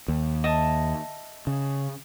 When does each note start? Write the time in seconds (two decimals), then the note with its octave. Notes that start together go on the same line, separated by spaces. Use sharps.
0.08 D#2
0.44 D#5 E5 A5
1.47 C#3